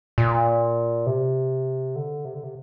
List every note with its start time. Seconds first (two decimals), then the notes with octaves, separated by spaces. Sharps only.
0.18 A#2
1.07 C3
1.96 D3
2.25 C3
2.34 D3
2.44 C3